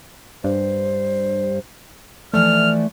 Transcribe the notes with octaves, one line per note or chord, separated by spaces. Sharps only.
G2 C5
E3 F3 A3 D5 F6